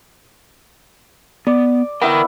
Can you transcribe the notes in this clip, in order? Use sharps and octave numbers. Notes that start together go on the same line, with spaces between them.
B3 D5
B3 E4 A#4 F#5 G5